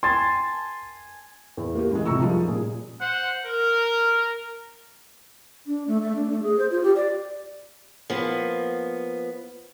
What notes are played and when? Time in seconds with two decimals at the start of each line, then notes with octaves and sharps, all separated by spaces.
0.03 G#5 A5 C6
1.57 E2
1.75 A#3 F#4 G4
1.91 C#2 E3 G#3
2.06 B1 F2 C3 A#5 C#6 E6
2.22 D#3 F3 G3 G#3
2.48 D#1 A#2 G#4
3.01 C5 F#5
3.45 A#4
5.67 D4
5.88 A3
6.02 A3
6.15 D4
6.30 A3
6.43 G#4
6.59 C5
6.71 F4
6.83 G4
6.96 D5
8.10 F3 A#3 B3